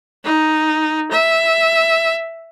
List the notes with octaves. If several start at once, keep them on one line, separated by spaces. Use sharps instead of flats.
D#4
E5